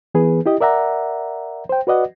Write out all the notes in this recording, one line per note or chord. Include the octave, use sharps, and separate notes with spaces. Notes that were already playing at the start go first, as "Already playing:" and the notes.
E3 B3 G#4 B4
E4 G4 D#5
A#4 D5 E5 F#5 A#5
C5 G5
F#4 B4 D5 D#5 F#5